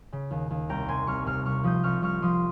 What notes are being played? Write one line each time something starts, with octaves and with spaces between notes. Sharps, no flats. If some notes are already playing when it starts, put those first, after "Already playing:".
C#3
D#2
D#2
C2 G5 A#5
C3 G#5 C6
C2 C#6 F6
C3 C#6 F6
C2 C#6 F6
F3 D#6 G6
C2 C#6 F6
C2 C#6 F6
F3 C6 D#6